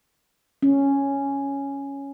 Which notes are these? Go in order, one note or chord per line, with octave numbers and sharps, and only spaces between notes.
C#4